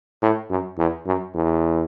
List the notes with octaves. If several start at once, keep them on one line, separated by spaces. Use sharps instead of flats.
A2
F#2
E2
F#2
E2